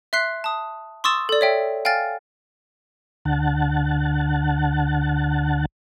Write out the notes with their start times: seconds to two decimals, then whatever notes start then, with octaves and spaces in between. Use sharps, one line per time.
0.13 E5 C6 F#6 C7
0.44 A5 D#6
1.04 C6 C#6 D#6 E6 A6 E7
1.29 A4 D5
1.41 C#5 E5 G5
1.85 F5 G5 G#5 F6 A6
3.25 D2 D3 F#5 A5